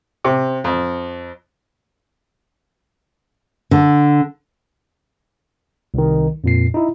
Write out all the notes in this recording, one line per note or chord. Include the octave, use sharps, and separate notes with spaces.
C3
F2
D3
C2 D#3
F2 A#2 C7
D#4 E4